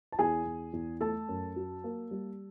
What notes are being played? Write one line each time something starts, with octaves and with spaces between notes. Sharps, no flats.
A5
E2 G#4 G#5
E2
E2
A3 A4 A5
F#2
F#3
A#3
G3